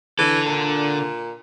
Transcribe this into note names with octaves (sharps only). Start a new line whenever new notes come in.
D3 E3 A4
A#2